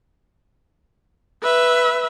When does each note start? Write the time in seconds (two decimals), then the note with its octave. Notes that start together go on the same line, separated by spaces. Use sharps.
1.43 B4 E5